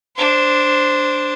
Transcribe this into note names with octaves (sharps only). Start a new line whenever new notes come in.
D4 C5